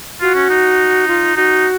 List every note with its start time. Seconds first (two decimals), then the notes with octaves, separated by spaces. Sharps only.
0.21 F4 F#4
0.35 C#4
0.50 D#4
1.08 F4
1.36 D#4 F#4